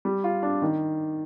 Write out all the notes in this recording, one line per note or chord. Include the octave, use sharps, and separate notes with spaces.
G3
F4
D4
D#3